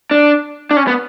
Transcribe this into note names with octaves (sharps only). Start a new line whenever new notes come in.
D4
D4
C#4
B3